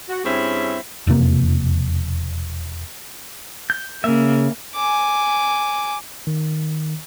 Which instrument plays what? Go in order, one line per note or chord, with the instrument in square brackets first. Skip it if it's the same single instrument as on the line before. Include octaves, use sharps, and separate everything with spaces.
[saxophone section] F#4
G2 C4 C#4 E4 G#4 E5
[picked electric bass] E1 F2 C3 A#3
[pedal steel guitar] G6
[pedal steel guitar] C#3 E5 [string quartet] A#3
[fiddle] G#5 D6
[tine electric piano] D#3